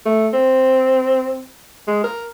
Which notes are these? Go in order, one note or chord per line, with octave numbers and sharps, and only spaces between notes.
A3
C4
G#3
A#4